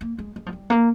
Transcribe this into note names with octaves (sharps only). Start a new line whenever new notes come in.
A#3
G#3
G#3
F3
G3
A#3